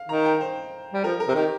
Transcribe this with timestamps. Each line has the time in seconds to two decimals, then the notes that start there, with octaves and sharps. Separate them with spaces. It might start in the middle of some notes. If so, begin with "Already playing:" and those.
Already playing: F5
0.09 D#3 A#5
0.25 G5
0.41 C5
0.93 G3
1.04 F3 A#4
1.20 A#4
1.28 C3
1.35 D#3 G4